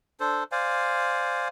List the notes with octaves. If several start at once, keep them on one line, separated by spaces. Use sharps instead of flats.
D4 A4 C5
C5 D5 F5 G#5